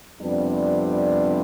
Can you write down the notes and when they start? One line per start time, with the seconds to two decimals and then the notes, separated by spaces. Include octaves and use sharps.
0.20 F2 C3 G3 B3 D4